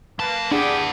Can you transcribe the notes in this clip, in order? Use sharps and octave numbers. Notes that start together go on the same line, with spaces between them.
F#3 A#3 B4 A5
D4 E4 G4 G#4 D5 F#5